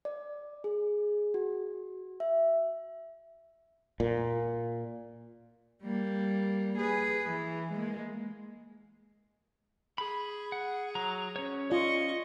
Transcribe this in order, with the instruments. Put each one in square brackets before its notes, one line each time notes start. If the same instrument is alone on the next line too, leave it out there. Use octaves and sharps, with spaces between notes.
[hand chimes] D5
G#4
F#4
E5
[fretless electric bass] A#2
[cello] G3 A#3
G#4 B4
E3
G#3 A#3
[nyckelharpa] G#4 [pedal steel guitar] B5
[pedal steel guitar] F#5
F#3 A#5
C#4 C#5
[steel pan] F4 D5 [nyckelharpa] D#5 C#6